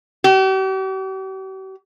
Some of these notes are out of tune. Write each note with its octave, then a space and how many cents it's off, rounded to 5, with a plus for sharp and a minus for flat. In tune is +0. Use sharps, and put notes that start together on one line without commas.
G4 -45